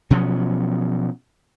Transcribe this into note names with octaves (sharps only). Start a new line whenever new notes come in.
B2 F3 F#3 C#4